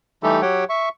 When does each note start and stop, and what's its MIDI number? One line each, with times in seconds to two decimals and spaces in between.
0.23 0.42 52
0.23 0.42 55
0.23 0.42 57
0.23 0.42 63
0.23 0.42 67
0.23 0.42 69
0.42 0.64 54
0.42 0.64 67
0.42 0.64 73
0.42 0.64 78
0.42 0.64 79
0.69 0.89 76
0.69 0.89 85